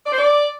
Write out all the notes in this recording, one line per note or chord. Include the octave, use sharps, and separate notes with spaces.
D5
C5
D5